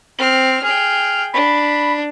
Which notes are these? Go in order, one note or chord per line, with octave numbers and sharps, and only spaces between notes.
C4 F6
G#4 G5 F6
D4 B5